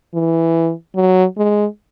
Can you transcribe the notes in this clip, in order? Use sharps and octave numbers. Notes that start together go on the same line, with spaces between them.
E3
F#3
G#3